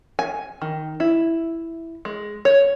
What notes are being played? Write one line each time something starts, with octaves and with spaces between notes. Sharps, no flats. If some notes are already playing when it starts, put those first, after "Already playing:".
G#5
D#3
E4
G#3
C#5